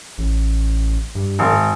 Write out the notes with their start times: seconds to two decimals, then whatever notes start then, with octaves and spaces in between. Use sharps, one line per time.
0.18 A1
1.15 G2
1.39 G#1
1.52 G#2